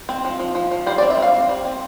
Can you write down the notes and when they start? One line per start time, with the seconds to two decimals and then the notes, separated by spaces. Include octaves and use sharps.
0.09 C4
0.25 F3
0.39 F3
0.55 F3
0.71 F3
0.86 G3 C5
0.98 D5
1.03 C4
1.10 E5
1.17 G3 F5
1.34 C4
1.49 G3
1.65 C4